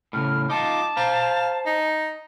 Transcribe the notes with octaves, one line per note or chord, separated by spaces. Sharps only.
A2 C#3 F6
D#4 F4 A5 D6
C5 F5 A#5
D#4